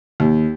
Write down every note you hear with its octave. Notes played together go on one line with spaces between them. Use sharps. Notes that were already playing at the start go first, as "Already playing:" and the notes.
D#2